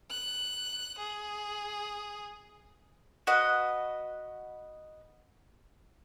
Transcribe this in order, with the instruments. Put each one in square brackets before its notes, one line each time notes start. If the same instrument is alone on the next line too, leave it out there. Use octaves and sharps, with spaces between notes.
[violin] F#6
G#4
[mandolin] F#4 B4 D#5